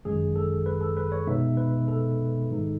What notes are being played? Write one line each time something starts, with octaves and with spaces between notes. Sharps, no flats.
G#1 F#2 D#3 G#3 G#4
A4
B4
A4
B4
C#5
B2 G#3 B3 D#4 E5
B4
A4
G#2 D#3 G#3 D#4